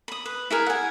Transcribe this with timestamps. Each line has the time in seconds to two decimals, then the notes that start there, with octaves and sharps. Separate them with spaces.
0.08 B5 D#6
0.26 B4
0.50 E4 G#4 A#4
0.66 F#5 G#5